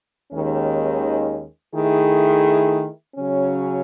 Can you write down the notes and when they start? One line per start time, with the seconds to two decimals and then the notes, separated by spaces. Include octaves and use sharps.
0.32 D#2 D#3 G#3 C#4
1.74 D#3 A3 E4 G#4
3.14 C#3 F#3 C#4